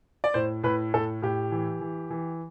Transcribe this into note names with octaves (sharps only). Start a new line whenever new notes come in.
D5
A2 C5
A2 B4
A2 A4
A2 G4
E3
E3
E3